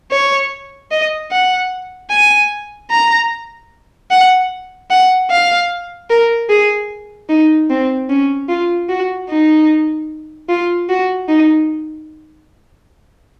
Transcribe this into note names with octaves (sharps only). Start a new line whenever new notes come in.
C#5
D#5
F#5
G#5
A#5
F#5
F#5
F5
A#4
G#4
D#4
C4
C#4
F4
F#4
D#4
F4
F#4
D#4